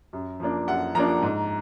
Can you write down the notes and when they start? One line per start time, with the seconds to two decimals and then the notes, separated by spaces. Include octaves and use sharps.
0.13 F#2
0.40 F3 A#3 D4
0.68 F#2 F#5
0.95 F3 A#3 D4 A#5
1.22 G#2